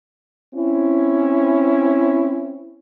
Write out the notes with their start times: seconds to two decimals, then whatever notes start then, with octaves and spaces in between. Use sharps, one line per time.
0.54 C4 C#4 E4